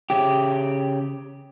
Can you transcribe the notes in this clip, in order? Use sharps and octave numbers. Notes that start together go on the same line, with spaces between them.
C#3 G4